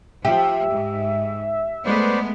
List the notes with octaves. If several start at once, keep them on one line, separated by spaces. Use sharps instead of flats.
F3 G4 E5
G#2
G#3 A3 B3 B4 C5 D5